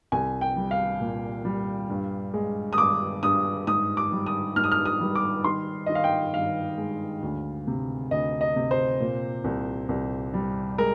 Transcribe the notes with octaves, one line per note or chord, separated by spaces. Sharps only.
C2 G#5
G5
G3
F5
A#2
G3
G2
G#3
D#6
G2 D6
G2 D#6
G#2 D#6
D6
G3
D#6
G#2 F6
D#6
F6
D#6
G3
D6
D#3 C6
D#3 D#5
F5
G5
G2 F5
G#3
D2
C3
D2 D#5
D#5
C3
C5
A#2
C2
C2
G3
G#3 A#4